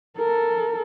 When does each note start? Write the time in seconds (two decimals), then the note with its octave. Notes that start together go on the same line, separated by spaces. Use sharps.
0.17 A4 A#4